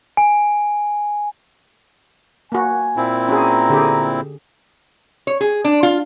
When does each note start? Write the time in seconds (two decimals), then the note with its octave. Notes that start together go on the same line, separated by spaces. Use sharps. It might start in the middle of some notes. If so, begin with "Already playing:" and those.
0.17 G#5
2.52 A#3 F#4 G#5
2.97 A#2 C4 E4
3.29 C#4 F#4 G#4 A#5
3.70 D3 G4 G#4
5.27 C#5
5.41 G#4
5.65 D4
5.83 F4